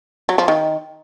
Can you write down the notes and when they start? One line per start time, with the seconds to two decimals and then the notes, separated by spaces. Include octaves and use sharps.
0.29 F#3
0.38 F3
0.48 D#3